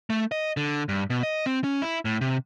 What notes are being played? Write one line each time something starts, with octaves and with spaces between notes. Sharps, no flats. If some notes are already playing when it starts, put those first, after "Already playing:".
A3
D#5
D3
G2
B2
D#5
C4
C#4
E4
A2
C3